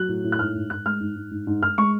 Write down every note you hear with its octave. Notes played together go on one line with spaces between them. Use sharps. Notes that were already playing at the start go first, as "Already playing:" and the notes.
Already playing: F#3 F#6
A2
A2
F#6
G#2 F6
G#2
G#2 F#6
G#3 F6
G#2
G#2
G#2
G#2
G#2 F6
G#3 C#6